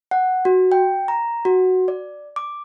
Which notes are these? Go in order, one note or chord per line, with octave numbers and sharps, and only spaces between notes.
F#5
F#4
G5
A#5
F#4
D5
D6